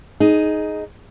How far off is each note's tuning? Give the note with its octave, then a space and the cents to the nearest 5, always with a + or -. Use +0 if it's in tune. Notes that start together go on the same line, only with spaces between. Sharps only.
D#4 +0 G#4 +15